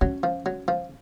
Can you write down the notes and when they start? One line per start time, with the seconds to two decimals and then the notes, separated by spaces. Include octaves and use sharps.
0.01 F#3 C#4
0.23 F3
0.46 F#3
0.68 F3